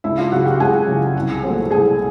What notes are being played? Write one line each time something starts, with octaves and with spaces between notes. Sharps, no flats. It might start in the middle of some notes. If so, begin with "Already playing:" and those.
C#2 E4 E5
F4 F5
C#3 F#3 F#4 F#5
G4 G5
C#2 G#4 G#5
C#3 F#3
C2
A#2 F#3 A3 C4
C2 G#4 G#5